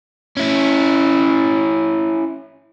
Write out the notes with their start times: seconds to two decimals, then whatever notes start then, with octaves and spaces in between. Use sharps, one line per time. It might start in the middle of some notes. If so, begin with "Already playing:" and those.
0.37 C#4 E4